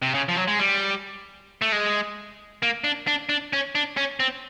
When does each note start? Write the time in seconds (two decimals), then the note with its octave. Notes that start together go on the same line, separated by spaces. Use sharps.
0.02 C3
0.14 C#3
0.28 F3
0.36 F#3
0.48 G#3
0.59 G3
1.62 A3
1.72 G#3
2.63 A#3
2.84 D4
3.07 D4
3.29 D4
3.53 C#4
3.75 D4
3.97 C#4
4.20 C4